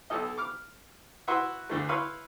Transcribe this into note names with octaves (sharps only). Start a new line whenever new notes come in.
B1 A4 D#5
D6 F6
E4 F#4 B4 E5 C6
D2 D3 A3
E4 B4 C#5 F5 C6